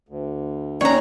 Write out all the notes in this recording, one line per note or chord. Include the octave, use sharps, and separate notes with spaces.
D2
D#2 C#4 C#5 D5 F#5 A#5